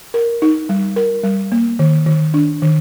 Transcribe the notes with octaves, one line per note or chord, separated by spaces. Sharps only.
A#4
D#4
G3
A#4
G3
A#3
D#3
D#3
D4
D#3